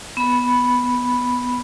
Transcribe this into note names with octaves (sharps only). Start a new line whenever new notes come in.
B3 B5